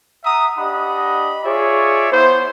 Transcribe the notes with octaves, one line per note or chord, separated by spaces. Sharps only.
E5 F#5 A#5 D#6
D4 G4 D#5 F#5 B5
F4 G#4 C#5 D5 E5
B3 E4 C5